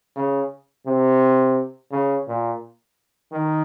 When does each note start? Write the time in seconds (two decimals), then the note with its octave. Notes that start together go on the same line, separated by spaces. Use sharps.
0.16 C#3
0.86 C3
1.91 C#3
2.28 A#2
3.32 D#3